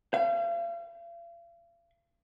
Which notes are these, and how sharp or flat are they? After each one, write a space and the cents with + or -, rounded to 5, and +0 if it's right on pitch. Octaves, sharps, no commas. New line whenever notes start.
F5 -40